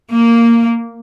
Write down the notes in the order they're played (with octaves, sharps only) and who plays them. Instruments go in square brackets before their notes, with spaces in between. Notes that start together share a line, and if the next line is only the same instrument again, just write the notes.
[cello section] A#3